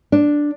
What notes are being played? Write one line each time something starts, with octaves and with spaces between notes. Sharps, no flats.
D4